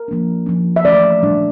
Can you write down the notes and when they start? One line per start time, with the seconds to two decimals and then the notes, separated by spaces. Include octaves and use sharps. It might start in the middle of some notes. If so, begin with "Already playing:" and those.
Already playing: A#4
0.08 F3 A#3 D4
0.46 F3 C#4
0.76 E5
0.85 E3 A3 C#4 D5
1.23 A#2 G3 D4